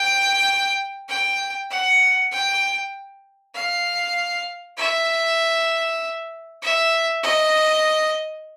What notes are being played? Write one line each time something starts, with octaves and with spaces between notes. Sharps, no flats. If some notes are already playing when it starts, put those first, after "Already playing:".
Already playing: G5
G5
F#5
G5
F5
E5
E5
D#5